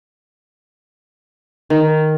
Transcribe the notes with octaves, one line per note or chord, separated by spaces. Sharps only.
D#3